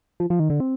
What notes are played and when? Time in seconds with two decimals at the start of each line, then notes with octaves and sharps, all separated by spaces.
0.20 F3
0.30 F3
0.40 D#3
0.50 D3
0.60 C4